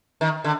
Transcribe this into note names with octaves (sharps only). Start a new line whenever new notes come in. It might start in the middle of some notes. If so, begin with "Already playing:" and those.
D#3
D3